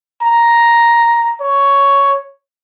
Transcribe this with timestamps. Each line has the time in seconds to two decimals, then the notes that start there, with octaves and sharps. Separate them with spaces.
0.23 A#5
1.41 C#5